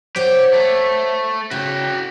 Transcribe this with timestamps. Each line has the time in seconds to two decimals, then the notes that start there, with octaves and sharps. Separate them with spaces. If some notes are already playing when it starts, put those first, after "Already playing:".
0.16 G4 C5 C#5 F#5
0.53 A3
1.51 C#3 F#4 G5